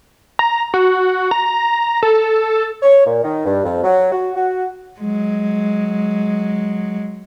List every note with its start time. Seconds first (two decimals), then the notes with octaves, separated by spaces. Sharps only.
0.39 A#5
0.74 F#4
1.31 A#5
2.03 A4
2.82 C#5
3.06 A#2
3.23 D#3
3.45 G2
3.64 F2
3.84 F#3
4.12 F#4
4.35 F#4
5.00 F#3 G#3